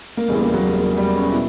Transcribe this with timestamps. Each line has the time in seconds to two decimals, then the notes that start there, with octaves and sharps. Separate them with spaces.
0.17 A#3
0.28 E1 E2 C#3 E3 G3
0.41 A#3
0.54 F#3
0.67 G3
0.80 A#3
0.97 G3
1.15 C#4
1.32 B2 E4